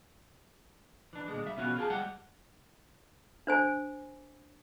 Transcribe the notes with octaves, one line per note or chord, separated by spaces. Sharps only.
E3 D4
A#2 D3 G#3
G3 E5
B2 E3 B3 C#4 F4 F#4
F4 G4 G#4 A5
G3 G#3 G4 F#5
D4 C5 G#5